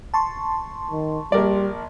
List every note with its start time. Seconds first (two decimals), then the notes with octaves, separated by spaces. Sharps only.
0.14 A5 C6 C#6
0.91 D#3
1.32 A#1 G3 A#4 D5